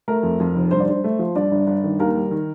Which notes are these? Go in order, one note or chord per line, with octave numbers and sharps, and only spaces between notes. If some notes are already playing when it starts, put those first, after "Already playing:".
A3 A#4
F2
F2
F1
G2 C5
D5
G2 C5
A3
F3
G2 D5
G1
G1
D#3
D#2 A#4
G3
D#3